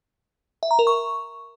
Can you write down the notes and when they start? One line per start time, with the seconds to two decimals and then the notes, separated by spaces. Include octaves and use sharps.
0.63 E5
0.71 A#5
0.79 A#4
0.87 C#6